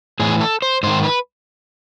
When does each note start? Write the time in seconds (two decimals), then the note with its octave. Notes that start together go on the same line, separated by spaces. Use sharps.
0.20 A2 E3 G#4
0.41 A4
0.62 C5
0.83 G#2 D#3 C5
1.03 B4